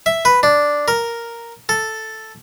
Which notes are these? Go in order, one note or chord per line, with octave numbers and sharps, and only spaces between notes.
E5
B4
D4
A#4
A4